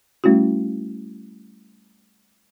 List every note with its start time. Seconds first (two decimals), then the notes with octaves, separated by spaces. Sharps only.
0.24 G3 A3 C#4 E4 F#4